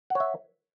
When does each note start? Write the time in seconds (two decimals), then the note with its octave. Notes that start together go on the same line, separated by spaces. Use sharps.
0.10 F#5
0.15 C#5
0.20 E5